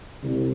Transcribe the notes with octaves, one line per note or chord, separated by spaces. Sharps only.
C2